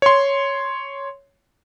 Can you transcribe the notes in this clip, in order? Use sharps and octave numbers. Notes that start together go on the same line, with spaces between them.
C#5 C6